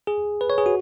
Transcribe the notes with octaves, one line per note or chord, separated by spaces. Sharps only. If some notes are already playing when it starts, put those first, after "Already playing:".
G#4
B4
C#5
G#4
F#4